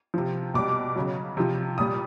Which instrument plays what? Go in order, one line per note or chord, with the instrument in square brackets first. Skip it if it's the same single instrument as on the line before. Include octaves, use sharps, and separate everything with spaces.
[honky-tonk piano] C3 F3
B2 G3 D6
C#3 F#3
C3 F3
A#2 G3 D#6